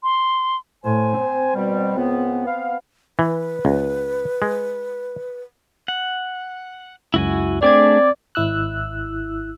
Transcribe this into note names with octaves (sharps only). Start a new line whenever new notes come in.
C6
A2 C5 G#5
C4
B2 G3
C#2 B3
B3 F5
E3 B4
C#2
G#3
F#5
C#2 F#2 E4 F#4 G#5
A3 C4 D4 G#4 D5 D6 G#6
G#1 E4 E6 F#6